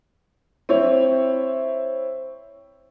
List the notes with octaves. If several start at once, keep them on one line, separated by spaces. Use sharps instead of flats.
C4 E4 C#5